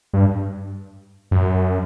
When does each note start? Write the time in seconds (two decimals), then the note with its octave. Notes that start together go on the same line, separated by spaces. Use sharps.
0.13 G2
1.31 F#2